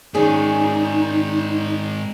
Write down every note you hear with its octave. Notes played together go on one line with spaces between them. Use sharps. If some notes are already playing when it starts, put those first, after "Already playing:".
G#2 D#3 C#4 D#4 G#4 D5